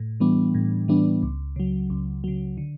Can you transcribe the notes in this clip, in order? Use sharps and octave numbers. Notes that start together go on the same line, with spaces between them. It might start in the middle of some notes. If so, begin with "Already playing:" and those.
Already playing: A2
E3 G3 B3 D4
A2
E3 G3 B3 D4
C#2
C#3 F#3
C#2
C#3 F#3
D3